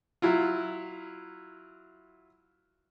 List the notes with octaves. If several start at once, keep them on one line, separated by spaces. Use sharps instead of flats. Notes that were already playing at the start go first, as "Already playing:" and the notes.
F#3 E4 F4